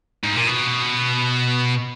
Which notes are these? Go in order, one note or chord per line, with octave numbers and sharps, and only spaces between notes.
G#2
A#2
B2